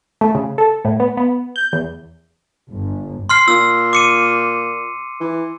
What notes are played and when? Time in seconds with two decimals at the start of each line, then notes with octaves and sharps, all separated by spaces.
0.21 A3
0.35 C#3
0.58 A4
0.85 A2
1.00 B3
1.17 B3
1.56 G6
1.73 E2
2.71 G1
3.29 C6 F6 C7
3.48 A#2 E6
3.93 D6 C#7 D#7
5.21 E3